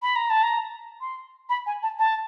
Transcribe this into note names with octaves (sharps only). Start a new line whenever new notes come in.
B5
A#5
A5
A#5
C6
B5
G#5
A5
A5